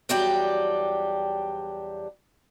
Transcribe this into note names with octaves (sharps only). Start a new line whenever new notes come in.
E2 F#3 G3 D4 G4 G5